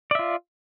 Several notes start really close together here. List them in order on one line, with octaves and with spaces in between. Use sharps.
D5 E5 F4